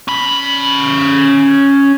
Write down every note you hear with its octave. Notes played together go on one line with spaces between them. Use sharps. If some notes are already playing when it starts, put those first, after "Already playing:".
C#4 B5